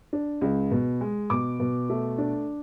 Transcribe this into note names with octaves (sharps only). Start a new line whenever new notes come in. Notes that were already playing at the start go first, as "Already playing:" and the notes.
D4
C#2
B2
G#3
B2 D6
B2
A3
D4